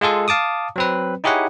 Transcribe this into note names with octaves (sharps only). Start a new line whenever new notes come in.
G#3 F4 G#4 A4
F5 A5 D6 D#6
F#3 C4 B4
D#4 E4 G4 G#4 C#5 F#5